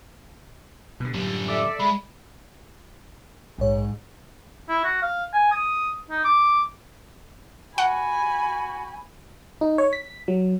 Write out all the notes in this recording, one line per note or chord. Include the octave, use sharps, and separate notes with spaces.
B2 D3
F#2 A2 D3 G3
A4 D5 E5 D6
G#3 B5
A#1 G#2 C#5
E4
F#4
F5
G#5
D#6
D#4
D6
F#4 F#5 G#5 B5
D#4
C#5
B6
F#3